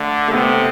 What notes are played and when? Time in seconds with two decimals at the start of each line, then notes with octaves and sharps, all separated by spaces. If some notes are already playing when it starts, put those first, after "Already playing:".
Already playing: D3 A3
0.28 A3
0.34 C3 B3